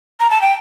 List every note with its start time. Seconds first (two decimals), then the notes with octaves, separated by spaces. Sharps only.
0.20 A#5
0.30 A5
0.41 G5